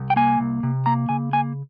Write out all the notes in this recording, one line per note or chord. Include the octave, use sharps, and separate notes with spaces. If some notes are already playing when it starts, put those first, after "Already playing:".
Already playing: C2
G5
A#3 G#5
C2
C3
A#3 A#5
C#3 G#5
A#3 G#5